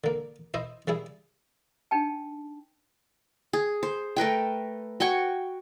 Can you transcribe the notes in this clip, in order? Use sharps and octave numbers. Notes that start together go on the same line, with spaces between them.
D3 A#3
E4 C5 D#5
C#3 G3 E4 G#4
D4 D#4 G5 A5
G#4
C5
A3 A#4 B4 G5
F#4 G5 G#5 C#6